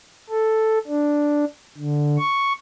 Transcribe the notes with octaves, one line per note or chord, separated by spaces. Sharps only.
A4
D4
D3
C#6